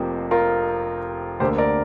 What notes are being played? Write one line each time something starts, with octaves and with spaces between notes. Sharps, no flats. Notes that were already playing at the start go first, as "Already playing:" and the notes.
Already playing: F1 F2 C3 F3 A#3 G4
F4 A#4
D2 D3 A#3 G4 C5
A#4 D5